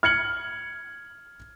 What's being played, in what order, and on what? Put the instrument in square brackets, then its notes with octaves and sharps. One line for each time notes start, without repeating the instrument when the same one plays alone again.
[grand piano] F6 G#6 C#7 F#7